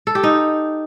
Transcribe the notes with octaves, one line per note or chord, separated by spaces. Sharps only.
A4
G4
D#4